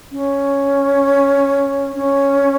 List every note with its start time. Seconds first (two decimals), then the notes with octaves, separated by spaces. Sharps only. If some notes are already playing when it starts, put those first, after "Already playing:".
0.12 C#4
1.95 C#4